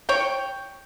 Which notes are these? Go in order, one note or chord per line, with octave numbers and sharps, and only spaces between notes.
C#5 G5